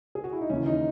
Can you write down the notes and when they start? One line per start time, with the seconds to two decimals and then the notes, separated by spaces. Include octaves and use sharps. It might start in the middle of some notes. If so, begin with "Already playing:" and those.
0.15 G#4
0.24 F#4
0.33 E4
0.41 D#4
0.50 D#2 C#3 E3 C#4
0.66 D#4